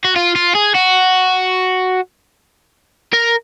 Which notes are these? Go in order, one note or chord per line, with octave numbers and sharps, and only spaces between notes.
F#4
F4
F4
G#4
F#4
A#4